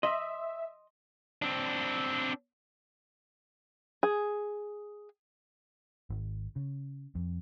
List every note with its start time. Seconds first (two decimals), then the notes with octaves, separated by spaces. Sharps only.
0.03 D#5 E5 C6
1.42 C4 D4
4.03 G#4
6.10 G#1
6.56 C#3
7.15 F2